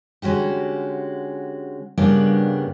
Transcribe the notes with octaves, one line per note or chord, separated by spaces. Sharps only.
D3 G#3 C#4 F#4 G4
G2 C#3 G3 A#3 B3 D4